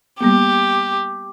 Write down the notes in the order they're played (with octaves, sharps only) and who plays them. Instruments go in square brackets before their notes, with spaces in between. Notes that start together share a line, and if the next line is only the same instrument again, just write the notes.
[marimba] G3 A#3 B3 [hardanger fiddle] G4